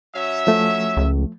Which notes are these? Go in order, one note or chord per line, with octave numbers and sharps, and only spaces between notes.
F#3 C#4 E5
F3 A3
C#2